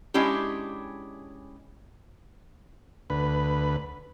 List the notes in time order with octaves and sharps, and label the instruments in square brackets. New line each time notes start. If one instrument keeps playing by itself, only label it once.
[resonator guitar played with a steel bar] G#3 C#4 D4 E4 G4
[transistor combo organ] D2 B4